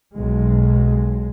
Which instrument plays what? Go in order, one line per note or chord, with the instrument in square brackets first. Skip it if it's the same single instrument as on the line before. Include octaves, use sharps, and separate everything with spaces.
[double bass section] B1 G#3